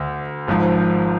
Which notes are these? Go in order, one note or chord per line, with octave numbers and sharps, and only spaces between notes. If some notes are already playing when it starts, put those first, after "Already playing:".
Already playing: D2
G#1 G#2 F3